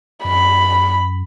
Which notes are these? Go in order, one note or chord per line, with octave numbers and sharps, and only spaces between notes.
F#2 B5